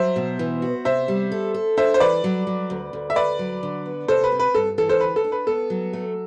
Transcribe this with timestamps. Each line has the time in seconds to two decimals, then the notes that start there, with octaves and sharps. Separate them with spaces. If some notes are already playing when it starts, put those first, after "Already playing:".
Already playing: F#3 C5 E5
0.16 B2
0.39 E3
0.62 F#4
0.85 C3 C5 E5
1.08 G3
1.32 A4
1.54 A4
1.77 D4 C5 E5
1.94 C5
2.00 E3 B4 D5
2.24 F#3
2.47 F#3
2.70 D2
2.93 D2
3.10 E5
3.16 D2 B4 D5
3.39 F#3
3.63 D3
3.86 B3
4.08 C3 A4 C5
4.24 B4
4.32 C4
4.39 B4
4.55 G2 A4
4.78 E3 A4
4.89 A4 C5
5.00 D2 B4
5.16 A4
5.24 D4
5.32 B4
5.47 B3 A4
5.70 F#3
5.93 A3